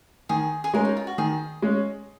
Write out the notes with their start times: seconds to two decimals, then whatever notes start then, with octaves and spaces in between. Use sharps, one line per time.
0.29 D#3 G#4
0.64 G#4
0.74 G#3 C#4 A#4
0.85 D#4
0.97 F4
1.07 F#4
1.18 D#3 G#4
1.62 G#3 C#4